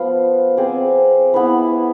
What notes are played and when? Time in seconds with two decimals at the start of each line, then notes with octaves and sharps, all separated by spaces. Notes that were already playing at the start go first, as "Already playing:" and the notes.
Already playing: F3 B3 F4
0.57 C4 G#4 D5
1.34 B3 E4 B4